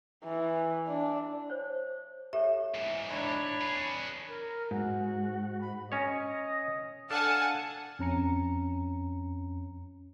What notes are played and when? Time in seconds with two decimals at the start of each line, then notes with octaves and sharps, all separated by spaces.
0.24 E3
0.88 D4
1.50 C5 C#5
2.33 G4 A4 C#5 E5
2.74 G#2 E3
3.11 D4 C#5 A#5 B5
3.61 G#4 B4 A#5
4.28 A#4
4.71 G#2 F#4
5.61 B5
5.92 C#4 C#5 D#5
7.10 D4 A4 F5 F#5 G#5 A5
7.99 F2 C#4 A#5 C#7